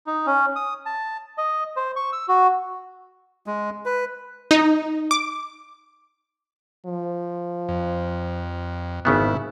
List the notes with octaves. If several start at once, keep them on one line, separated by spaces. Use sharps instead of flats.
D#4
C#4
D#6
A5
D#5
C5
C#6
E6
F#4
G#3
B4
D#4
D6
F3
F2
G#1 C#3 B3 E4